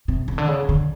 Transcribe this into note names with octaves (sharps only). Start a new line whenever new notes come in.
C3
C#3
D3
C#3
D3